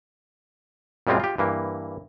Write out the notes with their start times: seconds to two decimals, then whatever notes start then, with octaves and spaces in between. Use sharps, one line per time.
1.07 F#2 A#2 G3 G#3 C4 F4
1.20 F4 G4
1.38 G2 E3 A#3